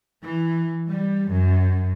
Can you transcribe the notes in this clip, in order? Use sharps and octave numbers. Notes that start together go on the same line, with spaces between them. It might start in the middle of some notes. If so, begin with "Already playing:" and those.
E3
G3
F#2